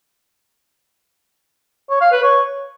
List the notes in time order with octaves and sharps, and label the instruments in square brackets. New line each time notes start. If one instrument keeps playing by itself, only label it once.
[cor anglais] C#5
F5
B4
C#5